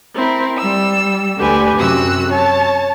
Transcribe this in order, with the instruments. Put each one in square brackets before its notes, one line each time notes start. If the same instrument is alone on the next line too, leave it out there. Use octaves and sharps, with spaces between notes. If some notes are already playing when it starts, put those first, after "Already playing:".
[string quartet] C4 E4 A#4
G3 E6
D2 D3 G4 B4 G#5
F#2 C3 F#4 E6 F#6
C#5 A5